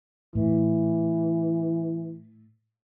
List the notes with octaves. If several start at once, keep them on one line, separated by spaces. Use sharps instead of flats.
A2 E3